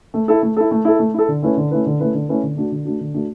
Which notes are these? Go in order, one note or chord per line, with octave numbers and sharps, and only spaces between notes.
A3
E4 A4
A3
E4 A4
A3
E4 A4
A3
E4 A4
D3
A3 C#4 E4 B4
D3
A3 C#4 E4 B4
D3
A3 C#4 E4 B4
D3
A3 C#4 E4 B4
D3
A3 D4 F#4
D3
A3 D4 F#4
D3
A3 D4 F#4